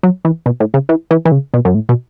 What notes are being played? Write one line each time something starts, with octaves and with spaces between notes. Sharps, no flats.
F#3
E3
B2
A2
C#3
E3
E3
E3
C#3
B2
F#2
A2
B2